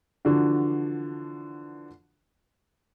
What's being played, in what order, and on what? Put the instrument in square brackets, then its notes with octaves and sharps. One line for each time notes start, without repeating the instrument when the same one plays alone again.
[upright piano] D3 E3 F3 D4 F#4